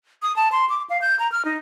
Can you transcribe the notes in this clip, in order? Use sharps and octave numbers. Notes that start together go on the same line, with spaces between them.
D#6
A5
C6
D6
F5
G6
A#5
F6
D#4